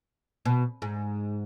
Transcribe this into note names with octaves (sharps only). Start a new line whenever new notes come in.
B2
G#2